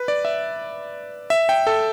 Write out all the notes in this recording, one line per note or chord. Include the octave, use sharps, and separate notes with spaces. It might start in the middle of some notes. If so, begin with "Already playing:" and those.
Already playing: B4
D5
E5
E5
G5
A4